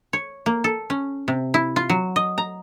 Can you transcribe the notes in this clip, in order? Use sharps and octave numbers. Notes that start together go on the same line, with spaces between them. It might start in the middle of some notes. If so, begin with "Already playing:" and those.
C#5
A#3
A4
C#4
C3
E4
F4
F#3
D#5
A#5